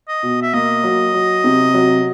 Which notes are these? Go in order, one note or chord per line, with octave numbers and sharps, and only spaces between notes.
D#5
B2
E5
A#3 D#5
F#3
F#3
C3
F#3